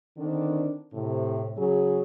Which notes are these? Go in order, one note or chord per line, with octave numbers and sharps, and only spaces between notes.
D3 D#3 C4 D4
A2 C3
C#3 F#3 G#4